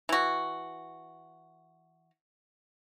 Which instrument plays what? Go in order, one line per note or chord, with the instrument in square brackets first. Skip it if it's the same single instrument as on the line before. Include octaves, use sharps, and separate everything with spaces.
[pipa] E3 F#4